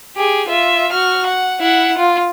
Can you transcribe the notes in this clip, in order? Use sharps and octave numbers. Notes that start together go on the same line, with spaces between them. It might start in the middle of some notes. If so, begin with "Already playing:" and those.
G4 G#4
F4 E5
F#4 F6
F#5
E4 F#5
F4